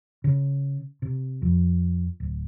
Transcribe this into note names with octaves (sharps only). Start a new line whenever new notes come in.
C#3
C3
F2
D1